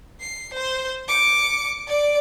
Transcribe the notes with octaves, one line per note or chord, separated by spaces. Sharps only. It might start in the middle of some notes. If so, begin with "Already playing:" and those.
C7
C5 C6
D6 C#7
D5 D6